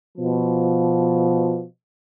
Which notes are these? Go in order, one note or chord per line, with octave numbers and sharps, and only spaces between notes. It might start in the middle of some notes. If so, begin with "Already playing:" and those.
B2 F3